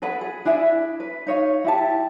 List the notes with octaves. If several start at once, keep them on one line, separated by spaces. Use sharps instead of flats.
G#4 A4 B4 F#5
G#4
D4 E4 G#4 E5
B4
D#4 C#5 F5
E4 G4 A5